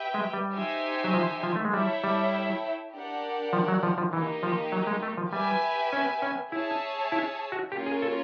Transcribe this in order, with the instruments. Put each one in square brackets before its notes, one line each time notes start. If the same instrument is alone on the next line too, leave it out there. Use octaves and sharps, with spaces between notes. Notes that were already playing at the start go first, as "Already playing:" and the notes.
Already playing: [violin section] G4 B4 E5 G5
[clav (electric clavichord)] G#3
G3
[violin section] D#4 G4 C5 E5 G#5
[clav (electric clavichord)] F#3
F3
F3
A3
G#3
[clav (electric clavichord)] G3 [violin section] E4 A4 C#5 E5 G5
[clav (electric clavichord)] G3
[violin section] D4 G4 A#4 D5 F#5
[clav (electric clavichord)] F3
F#3
F3
F3
[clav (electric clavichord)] E3 [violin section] A#3 D#4 G4
[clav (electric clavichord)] F3
F#3
G#3
A3
F3
[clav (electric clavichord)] G3 [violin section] G4 B4 E5 G#5
[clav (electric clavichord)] C#4
C#4
[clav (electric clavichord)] E4 [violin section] G#4 C#5 E5 A5
[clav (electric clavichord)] E4
F#4
[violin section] A#3 C#4 F4 A#4 C#5 [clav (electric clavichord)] G4
[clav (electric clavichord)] G#4
A4